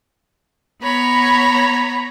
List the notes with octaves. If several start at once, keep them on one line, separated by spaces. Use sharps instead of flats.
B3 C#5 A#5 B5